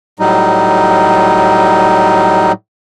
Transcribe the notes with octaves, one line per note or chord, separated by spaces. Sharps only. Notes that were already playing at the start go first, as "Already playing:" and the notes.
A2 F#3 G3 D#4